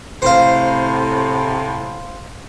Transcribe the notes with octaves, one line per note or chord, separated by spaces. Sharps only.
A2 C3 C5 F5